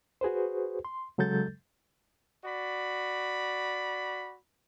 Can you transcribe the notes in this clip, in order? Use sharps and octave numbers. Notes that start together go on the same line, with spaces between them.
F#4 G#4 B4 C5
C6
C#3 F#3 G#3 A4 G6 A6
F#4 D5 B5